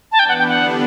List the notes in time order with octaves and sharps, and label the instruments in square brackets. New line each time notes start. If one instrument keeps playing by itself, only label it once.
[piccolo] A5
[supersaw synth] E3 B3 D4 [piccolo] G5
[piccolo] F#5
G5
[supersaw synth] D3 G3 B3 D4 [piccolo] F#5